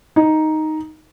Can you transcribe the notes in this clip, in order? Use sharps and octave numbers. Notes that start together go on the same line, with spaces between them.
D#4